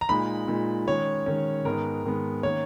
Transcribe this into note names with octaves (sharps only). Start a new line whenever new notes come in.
A#5
A#2 G#3 D#4 B5
A#2 G#3 D#4
D#3 G#3 C#4 C#5
D#3 G#3 C#4
G#2 D#3 G#3 B3 A#4
G#2 D#3 G#3 B3
D#3 A#3 C#4 C#5